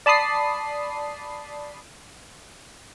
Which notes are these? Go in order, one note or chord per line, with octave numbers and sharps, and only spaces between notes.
D5 A5 B5 D#6 C7